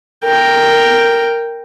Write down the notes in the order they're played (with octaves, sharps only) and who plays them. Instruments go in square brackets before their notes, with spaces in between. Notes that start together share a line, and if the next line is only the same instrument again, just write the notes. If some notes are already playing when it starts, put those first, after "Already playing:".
[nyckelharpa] A#4 G5